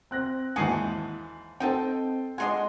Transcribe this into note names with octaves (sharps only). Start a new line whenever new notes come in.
C4 F#6 A#6
D#2 G#2 E3 F#4 G#5 A5 D#6 C7
C4 D#4 A4 C5 D#5 G5 A5
G#3 D4 F4 D#5 F#5 G#5 C6